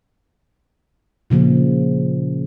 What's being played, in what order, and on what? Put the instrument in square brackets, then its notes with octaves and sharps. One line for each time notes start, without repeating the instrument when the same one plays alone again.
[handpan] A#2 C#3 F3 A#3